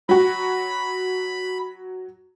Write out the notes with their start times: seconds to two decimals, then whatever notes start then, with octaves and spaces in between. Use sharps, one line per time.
0.09 F#3 F#4 B5